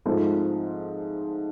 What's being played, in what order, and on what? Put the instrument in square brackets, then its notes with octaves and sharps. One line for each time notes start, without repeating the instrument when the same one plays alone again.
[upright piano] G#2 F3 A3 C4